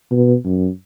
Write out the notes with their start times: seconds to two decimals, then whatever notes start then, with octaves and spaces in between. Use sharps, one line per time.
0.11 B2
0.45 F#2